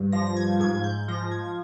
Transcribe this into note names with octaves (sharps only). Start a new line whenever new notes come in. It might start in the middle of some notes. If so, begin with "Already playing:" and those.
Already playing: G2
F3 A#6
A#6
G#6
G#2 G#6
G6
F3 A#6
G#6